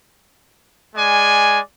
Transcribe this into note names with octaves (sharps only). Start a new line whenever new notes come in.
G#3 D5 G#5